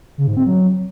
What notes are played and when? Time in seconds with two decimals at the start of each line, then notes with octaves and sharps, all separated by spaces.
0.18 C#3
0.27 G#2
0.37 C4
0.46 F#3